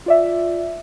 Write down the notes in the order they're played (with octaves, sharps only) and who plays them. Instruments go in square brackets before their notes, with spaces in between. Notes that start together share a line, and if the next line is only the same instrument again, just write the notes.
[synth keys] F4 D5 E5